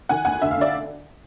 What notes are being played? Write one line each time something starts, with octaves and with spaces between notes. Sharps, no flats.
D#3 F#5 G#5
D2 F#5 G#5
D3 E5
F5
D3 D5 E5